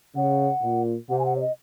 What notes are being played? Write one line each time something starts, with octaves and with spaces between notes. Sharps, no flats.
C#3 F#5
A#2
C3 F#5
G#5
F#5
C#5
D#5